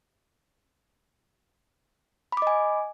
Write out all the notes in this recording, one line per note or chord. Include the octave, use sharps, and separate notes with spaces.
D#5 G#5 B5 D6